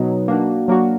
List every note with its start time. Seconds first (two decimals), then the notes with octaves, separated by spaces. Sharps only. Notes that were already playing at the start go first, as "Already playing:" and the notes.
Already playing: B2 F#3 B3 D#4
0.28 A#3 D4 F#4
0.68 F#3 A#3 D4 F#4